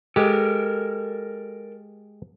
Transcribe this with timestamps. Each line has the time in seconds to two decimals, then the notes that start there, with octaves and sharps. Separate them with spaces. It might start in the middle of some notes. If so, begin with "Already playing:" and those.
0.16 G#3 G4 A4 A#4